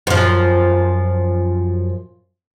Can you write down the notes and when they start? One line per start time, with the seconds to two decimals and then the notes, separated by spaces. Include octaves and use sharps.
0.07 F#2 F3